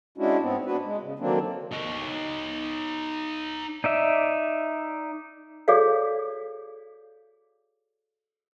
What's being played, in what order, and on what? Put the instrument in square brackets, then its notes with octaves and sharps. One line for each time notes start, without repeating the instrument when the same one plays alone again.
[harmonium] G#3 C#4 D4 E4 F#4
G#2 B3 C4
B3 D4 F#4 B4
G#3
C#3
D3 D#3 F#3 A#3 C4 D4
[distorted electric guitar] D#4 C#5
[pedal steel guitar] D#4 D5 E5
[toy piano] F#4 G#4 A4 C#5 D5 F5